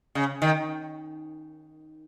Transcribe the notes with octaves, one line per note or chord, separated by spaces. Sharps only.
C#3
D#3